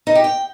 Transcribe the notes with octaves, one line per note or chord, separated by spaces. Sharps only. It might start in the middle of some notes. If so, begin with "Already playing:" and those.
D#4
G4
G5